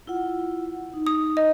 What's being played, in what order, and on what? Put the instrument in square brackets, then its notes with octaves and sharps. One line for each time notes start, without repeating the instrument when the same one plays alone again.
[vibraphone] E4 F4 F#5
D#4
[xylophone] D#6
D#5